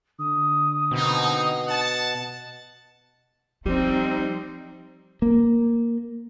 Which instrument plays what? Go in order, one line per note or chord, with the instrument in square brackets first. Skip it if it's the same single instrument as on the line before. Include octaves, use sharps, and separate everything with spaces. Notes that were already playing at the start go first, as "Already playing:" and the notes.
[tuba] D3 [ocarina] D#6
[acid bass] B2 [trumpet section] A#3 C4 D#4
[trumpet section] F#5 A5
[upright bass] F3 [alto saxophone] G3 [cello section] C4 D#4
[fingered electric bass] A#3